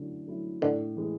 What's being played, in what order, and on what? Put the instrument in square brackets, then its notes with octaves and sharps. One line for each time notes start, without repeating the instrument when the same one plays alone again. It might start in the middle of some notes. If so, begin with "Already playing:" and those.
Already playing: [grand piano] D3 F#3 A3 C#4 E4
F#3 A3 C#4 E4
[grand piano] A2 [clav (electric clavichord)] D3
[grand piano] E3 G#3